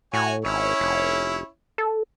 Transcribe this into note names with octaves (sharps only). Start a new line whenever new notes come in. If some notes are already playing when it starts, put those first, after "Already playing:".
A2 F#4 C#5 G#5
G#1 C#4 E4 C#5
F1
A4